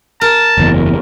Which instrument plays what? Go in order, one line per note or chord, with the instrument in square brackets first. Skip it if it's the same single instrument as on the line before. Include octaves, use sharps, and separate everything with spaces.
[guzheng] A#4 [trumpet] A5
[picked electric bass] F#1 E2